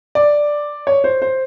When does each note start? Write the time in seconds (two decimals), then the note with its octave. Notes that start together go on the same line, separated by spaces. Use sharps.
0.15 D5
0.87 C#5
1.04 C5
1.22 C5